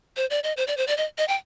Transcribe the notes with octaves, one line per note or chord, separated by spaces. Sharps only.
C5
D5
D#5
C5
D5
C5
D5
D#5
D#5
G5